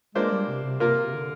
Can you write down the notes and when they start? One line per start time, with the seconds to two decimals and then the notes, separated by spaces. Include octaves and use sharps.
0.15 G#3 A#3 D4 F4 C5
0.31 G3
0.48 C3
0.65 C3
0.80 C3 A#3 F4 A#4
1.05 C3
1.14 D3